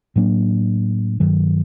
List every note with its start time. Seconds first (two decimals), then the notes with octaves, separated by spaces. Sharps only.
0.16 A2 F#3 A#3 D4
1.20 G2 D#3 F#3